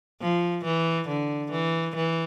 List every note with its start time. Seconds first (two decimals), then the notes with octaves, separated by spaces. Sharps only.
0.21 F3
0.64 E3
1.08 D3
1.51 E3
1.96 E3